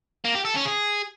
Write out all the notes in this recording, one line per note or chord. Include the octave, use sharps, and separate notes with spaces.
A#3
G4
A4
C#4
G#4